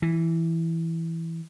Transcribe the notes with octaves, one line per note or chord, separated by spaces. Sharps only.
E3